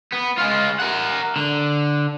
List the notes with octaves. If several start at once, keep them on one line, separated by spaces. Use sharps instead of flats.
B3
G#3 F4
A#4 F#5
D3